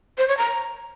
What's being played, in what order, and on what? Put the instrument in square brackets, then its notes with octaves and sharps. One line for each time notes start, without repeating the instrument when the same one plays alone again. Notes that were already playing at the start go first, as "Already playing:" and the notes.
[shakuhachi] C5
C#5
A#5